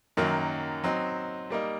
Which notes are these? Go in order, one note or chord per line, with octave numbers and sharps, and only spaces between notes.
F#2 D#3 F#3 A#3
F#3 C4 D#4
G3 A#3 D#4